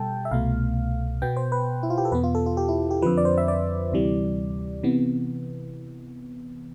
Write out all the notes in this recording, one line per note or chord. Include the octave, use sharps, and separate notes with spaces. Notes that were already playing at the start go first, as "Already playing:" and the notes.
Already playing: B2 G3 A4 G5 A5
E5
C2 B2 A3 F5
B2 B3 G5
C5
B4
E4
F4
G4
A4
E2 B2 B3 B4
F4
A4
F4
G4
E4
G4
F2 D3 F3 B4
D5
C5
E5
D5
D2 C3 E3 G3
C3 E3 B3